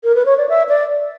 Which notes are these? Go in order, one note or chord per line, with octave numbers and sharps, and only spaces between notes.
A#4
B4
C#5
D5
E5
D5